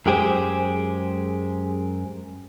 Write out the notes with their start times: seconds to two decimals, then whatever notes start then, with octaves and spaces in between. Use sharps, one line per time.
0.06 F#2 G#3 G4 G#4 C5